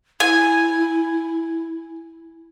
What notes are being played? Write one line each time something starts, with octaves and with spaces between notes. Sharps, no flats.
E4 G#5